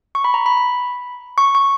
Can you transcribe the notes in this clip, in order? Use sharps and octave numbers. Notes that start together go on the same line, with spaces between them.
C#6
B5
A#5
B5
B5
C#6
C#6